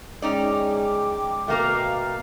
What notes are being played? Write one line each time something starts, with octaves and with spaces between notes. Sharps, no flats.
G#3 C#4 D#4 D5 G5 D6
B2 A3 A#3 A#4 F5